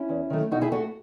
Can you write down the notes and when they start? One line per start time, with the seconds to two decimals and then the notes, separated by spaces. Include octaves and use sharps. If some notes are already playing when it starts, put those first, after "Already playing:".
Already playing: C#4 E4
0.09 E2
0.30 D#3 F#3 A3
0.51 B2 D#4 F#4
0.61 E4 G#4
0.72 A3 F#4 A4